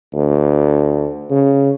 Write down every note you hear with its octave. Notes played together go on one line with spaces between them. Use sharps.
D2
C#3